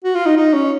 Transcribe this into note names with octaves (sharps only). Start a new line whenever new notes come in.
F#4
F4
D#4
D#4
C#4